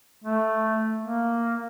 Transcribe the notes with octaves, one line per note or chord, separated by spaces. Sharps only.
A3
A#3